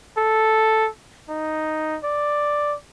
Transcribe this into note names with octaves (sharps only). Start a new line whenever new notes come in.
A4
D#4
D5